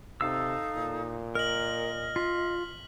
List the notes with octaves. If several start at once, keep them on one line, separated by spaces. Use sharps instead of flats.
C3 D#4 A4 F5 E6
A#2
A#4 D#5 F6 F#7
F4 B6